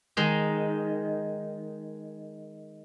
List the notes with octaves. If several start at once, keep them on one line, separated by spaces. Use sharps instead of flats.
D#3 G#3 D#4